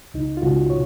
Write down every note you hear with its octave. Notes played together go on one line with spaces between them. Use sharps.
C#2 D#4
F4
C#2 F#4
B2 C#5